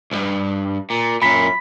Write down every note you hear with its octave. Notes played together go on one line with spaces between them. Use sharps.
C2 G2
A#2
F#2 A#2 B5 B6